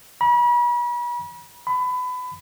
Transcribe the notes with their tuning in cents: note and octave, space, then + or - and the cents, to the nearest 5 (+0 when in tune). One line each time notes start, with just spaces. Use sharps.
B5 -40
B5 +25